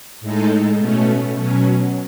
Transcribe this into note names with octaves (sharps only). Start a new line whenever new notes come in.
A2 G#3 D#4 A4
B2 A3 C#4
B2 F#3 C#4